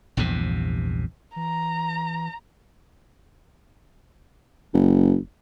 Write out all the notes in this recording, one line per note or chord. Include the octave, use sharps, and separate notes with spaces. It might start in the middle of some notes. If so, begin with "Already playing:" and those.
A#1 E2 G2 C3
E3 A#5
F#1